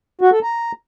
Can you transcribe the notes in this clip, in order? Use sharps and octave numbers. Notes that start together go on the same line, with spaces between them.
F#4
A4
A#5